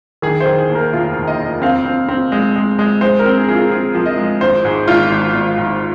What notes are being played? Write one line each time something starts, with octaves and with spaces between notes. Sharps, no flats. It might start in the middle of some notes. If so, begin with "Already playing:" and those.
D#3 G#4
C5
D#3
G#4
D#2
A#4
F1 F4
D#2
D#5
F1
C4 F5
C4
C4
G#3
G#3
G#3
G#3 C5
A#4
C4
G#4
F3 G#4
F4
C4 G#4
F3
D#5
G#3
G#1 C5
G#2 G#4
G#1 F4
G#1
G#1
G#2